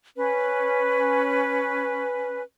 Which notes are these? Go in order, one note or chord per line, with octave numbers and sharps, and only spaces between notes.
C#4 B4